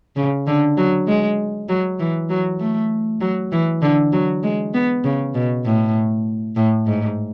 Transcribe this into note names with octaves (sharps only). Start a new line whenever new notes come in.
C#3
D3
F#3
G#3
F#3
E3
F#3
A3
F#3
E3
D3
F#3
G#3
B3
C#3
B2
A2
A2
G#2